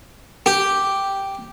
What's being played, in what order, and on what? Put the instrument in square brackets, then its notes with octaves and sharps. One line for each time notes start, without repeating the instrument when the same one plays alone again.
[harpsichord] G4